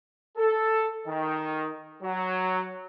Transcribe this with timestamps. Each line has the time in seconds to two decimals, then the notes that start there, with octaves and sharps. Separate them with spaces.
0.37 A4
1.06 D#3
2.02 F#3